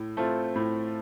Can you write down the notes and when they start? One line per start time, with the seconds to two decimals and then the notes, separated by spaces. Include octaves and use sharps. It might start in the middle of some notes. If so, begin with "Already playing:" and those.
Already playing: A2
0.17 A3 C4 F4
0.56 A2